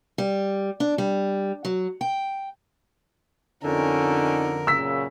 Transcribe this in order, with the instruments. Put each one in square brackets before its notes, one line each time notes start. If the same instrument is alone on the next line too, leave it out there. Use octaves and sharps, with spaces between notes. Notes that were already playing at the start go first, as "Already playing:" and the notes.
[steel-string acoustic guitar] G3
D4
G3
F#3
G5
[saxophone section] F2 D3 [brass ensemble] C#4 D#4 [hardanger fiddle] A#4
[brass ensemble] F#2 A#2 C#3 [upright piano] E6 B6